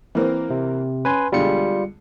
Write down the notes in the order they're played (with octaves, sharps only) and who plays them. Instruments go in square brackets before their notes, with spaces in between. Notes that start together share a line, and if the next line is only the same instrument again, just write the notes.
[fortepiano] E3 A#3 C4
[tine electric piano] C3
[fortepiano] C#4 [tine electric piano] B4 G#5 C6
[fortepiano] B2 D3 G#3 [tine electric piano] G3 F4 C#7